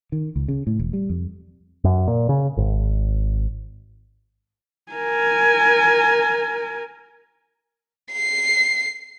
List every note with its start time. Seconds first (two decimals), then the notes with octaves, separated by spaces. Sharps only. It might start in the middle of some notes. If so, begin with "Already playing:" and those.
0.12 D#3
0.36 C#2
0.48 C#3
0.67 A2
0.79 E1
0.93 G3
1.10 F2
1.84 F#2
2.08 A#2
2.29 C#3
2.57 G#1
4.92 A#4 G#5
8.12 C7